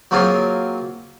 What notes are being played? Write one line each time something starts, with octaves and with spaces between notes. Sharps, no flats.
F#3 A#3 C4 F4 G#4